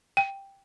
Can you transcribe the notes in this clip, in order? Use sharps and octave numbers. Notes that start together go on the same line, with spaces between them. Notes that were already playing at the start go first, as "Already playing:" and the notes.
G5